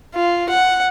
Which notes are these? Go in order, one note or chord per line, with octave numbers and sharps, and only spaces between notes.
F4
F#5